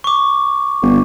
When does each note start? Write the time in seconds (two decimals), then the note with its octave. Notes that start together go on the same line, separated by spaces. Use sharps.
0.04 C#6 D6
0.83 G1